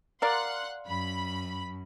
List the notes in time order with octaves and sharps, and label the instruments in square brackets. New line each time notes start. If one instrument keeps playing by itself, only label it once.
[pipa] A#4 D5 F5 [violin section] F#5 C6 F#6
[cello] F#2 [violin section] B5